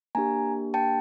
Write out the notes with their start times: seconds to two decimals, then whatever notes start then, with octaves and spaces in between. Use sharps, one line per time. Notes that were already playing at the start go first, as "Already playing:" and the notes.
0.15 A#3 D4 G4 G#5 A#5
0.74 G5 A5